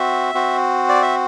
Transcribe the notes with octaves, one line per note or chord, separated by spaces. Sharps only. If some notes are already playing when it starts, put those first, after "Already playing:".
Already playing: C4 F#4 E5
C4 F#4
D5
E5